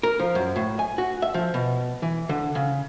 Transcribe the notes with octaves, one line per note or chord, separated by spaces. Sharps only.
A#4
F3
F#2
A2
G#5
F#4
E5
F3
B2
E3
D3
C#3